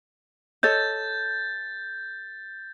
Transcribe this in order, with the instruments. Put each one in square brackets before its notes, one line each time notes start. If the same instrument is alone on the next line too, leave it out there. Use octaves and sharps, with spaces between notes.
[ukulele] A4 C#5 D#5 [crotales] G6 A6